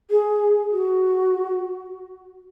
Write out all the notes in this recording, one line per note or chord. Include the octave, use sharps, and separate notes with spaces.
G#4
F#4